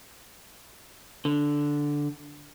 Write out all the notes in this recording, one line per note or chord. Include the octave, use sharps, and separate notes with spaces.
D3